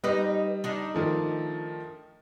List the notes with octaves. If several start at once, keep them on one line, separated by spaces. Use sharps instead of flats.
G3 D#4 B4 D#5
D4 D#4
D#3 F3 A3